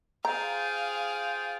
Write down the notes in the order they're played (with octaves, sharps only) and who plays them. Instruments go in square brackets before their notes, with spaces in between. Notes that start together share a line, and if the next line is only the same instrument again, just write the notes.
[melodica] F4 C5 G5 [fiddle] G#4 F5 [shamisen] A#5